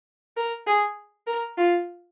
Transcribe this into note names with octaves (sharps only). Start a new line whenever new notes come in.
A#4
G#4
A#4
F4